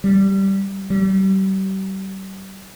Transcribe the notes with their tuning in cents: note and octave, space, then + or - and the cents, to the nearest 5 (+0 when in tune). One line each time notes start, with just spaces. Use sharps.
G3 -10
G3 -35